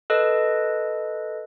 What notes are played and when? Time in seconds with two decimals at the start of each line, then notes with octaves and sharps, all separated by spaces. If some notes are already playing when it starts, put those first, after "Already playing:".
0.10 A4 B4 D#5